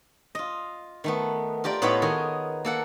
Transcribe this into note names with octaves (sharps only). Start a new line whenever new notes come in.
F4 D#5
D#3 A3 B3
F4 G4 A#4 D5
A2 B3 D#4 G4 C#5 B5
D#3 G#4 C#5 D#5
A#3 A4 F#5